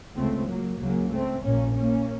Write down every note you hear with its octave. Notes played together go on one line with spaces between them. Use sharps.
C#2 C#3 A3 C4
F#3 A#3
C#2 C#3 F#3 A#3
A3 C4
A#1 A#2 A#3 C#4
A#3 C#4